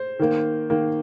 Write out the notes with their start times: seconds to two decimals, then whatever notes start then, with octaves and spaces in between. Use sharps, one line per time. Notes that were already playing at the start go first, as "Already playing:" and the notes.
Already playing: C5
0.19 D#3 A#3
0.70 D#3 A#3